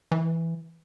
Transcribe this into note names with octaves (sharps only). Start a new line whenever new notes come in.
E3